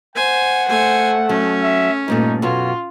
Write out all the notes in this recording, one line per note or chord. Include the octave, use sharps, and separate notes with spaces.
C5 F#5 G#5
A3 C5 G#5
F#3 C#4
E5
G2 A#2 A3 D#4
F#2 B2 F4 F#4 C#5